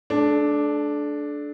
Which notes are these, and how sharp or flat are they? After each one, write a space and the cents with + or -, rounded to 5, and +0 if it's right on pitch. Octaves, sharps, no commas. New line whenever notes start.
A3 -35 D4 +0